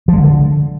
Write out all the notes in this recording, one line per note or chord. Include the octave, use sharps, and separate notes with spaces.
F3
G#3
D3